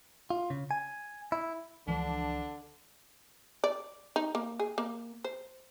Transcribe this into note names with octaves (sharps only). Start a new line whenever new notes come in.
F4
C#3
G#5
E4
C#2 D3 E3 F3 D4
D5
D#4
A#3
G#4
A#3
C5